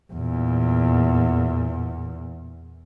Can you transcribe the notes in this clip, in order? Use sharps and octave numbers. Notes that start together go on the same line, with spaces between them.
E2 A#2